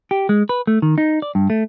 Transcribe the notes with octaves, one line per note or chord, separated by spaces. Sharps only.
G4
G#3
B4
A3
D#3
D#4
D5
G2
A3